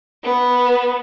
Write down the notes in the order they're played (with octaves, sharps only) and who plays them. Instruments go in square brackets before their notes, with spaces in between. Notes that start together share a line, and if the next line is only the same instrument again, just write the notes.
[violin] B3